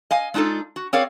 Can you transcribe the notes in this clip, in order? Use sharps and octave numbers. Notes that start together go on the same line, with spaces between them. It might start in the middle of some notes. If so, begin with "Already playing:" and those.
D#5 F5 G#5
G#3 D4 D#4 F4 A4
F#4
C4 G#4 A#4 C#5 D5 F5